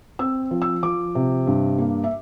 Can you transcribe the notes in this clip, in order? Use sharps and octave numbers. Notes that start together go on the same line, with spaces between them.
C4 E6
F3
E6
F3 D6
C3
G2
A#3
E5